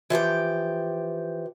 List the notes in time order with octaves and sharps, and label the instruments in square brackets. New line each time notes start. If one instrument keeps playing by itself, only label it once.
[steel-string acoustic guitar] E3 F3 G4 G5